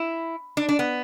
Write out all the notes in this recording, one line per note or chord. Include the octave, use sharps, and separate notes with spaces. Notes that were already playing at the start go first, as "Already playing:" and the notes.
Already playing: E4
D4
D4
B3